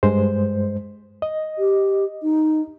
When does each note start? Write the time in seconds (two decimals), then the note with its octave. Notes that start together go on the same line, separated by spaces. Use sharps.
0.03 G2 G#3 C5
1.22 D#5
1.58 G4
2.23 D#4